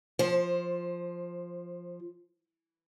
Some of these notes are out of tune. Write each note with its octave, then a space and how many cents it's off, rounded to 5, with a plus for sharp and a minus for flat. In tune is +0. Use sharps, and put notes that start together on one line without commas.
F3 +0 C5 +20